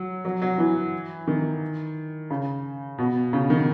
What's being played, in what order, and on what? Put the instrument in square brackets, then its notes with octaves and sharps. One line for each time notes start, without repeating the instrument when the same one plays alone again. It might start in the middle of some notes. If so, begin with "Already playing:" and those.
Already playing: [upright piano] F#3
F#3
F#3
E3
D#3
C#3
B2
C#3
D#3